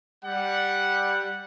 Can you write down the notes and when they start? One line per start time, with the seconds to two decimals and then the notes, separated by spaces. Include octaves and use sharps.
0.25 G3 F#5